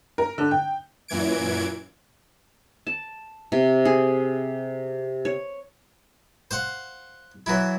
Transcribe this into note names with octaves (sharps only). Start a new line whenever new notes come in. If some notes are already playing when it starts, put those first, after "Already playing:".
A#4
D3
G5
F#2 A#2 E3 G#6 D7
A5
C3
G#4
C#5
C5 F5 F#5
E3 F#3 E4